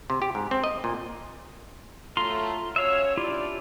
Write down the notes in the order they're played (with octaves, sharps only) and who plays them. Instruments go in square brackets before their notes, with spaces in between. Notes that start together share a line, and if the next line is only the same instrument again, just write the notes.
[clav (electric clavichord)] C3
G4
G#2
C4
D#5
A#2
[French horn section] A2 F#3 A3 [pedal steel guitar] F4 A#5 C6
[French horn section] C#4 F#4 C#5 [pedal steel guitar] E5 F5 E6
[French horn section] C3 D4 D5 [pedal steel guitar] E4 F4 G4